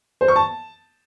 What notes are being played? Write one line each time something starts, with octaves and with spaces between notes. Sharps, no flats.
C5
C#6
A5